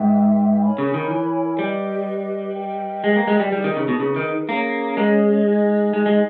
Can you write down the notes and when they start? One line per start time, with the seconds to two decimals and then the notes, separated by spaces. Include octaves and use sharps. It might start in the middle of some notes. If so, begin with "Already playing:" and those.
Already playing: G#2 B4 E5 G5
0.62 A#4 C#5 G#5 B5
0.78 C#3
0.94 D#3
1.11 E3
1.59 G3 G4 B4 D#5
2.55 B4 D#5 G5
3.04 G#3
3.16 A#3
3.27 G#3
3.40 G3
3.52 G3 D#4 G#4 B4
3.64 D#3
3.76 C#3
3.88 B2
4.00 C#3
4.16 D#3
4.48 A#3 C#4 G#4 C#5
4.97 G#3
5.45 D#4 G#4 D#5 G#5
5.93 G#3
6.06 G#3